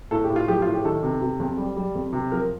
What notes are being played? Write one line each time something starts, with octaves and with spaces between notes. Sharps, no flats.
A2 A4
G4
A2
F4
F3 G4
A2 F4
G4
D#3 A4
C3
C3
F2
G3
G3
F2
C3
F3 A#4